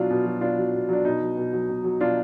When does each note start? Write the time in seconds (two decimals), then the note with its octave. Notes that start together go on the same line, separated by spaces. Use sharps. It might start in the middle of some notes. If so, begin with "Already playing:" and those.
Already playing: B2 F#3 D4 F4
0.10 B2
0.26 F#3
0.41 B2 D4 F4
0.58 F#3
0.74 B2
0.89 F#3 D4
1.05 B2 D#4
1.22 F#3
1.37 B2
1.53 F#3
1.69 B2
1.84 F#3
2.01 B2 D4 F4